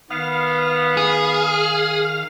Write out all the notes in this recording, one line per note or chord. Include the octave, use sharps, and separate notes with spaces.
D#3 B3 F5
G#4